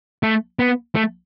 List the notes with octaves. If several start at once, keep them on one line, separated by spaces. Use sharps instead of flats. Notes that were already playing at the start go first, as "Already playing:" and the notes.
A3
B3
A3